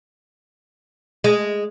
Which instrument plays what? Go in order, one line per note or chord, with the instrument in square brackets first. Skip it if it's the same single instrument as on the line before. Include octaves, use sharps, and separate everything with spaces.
[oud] G#3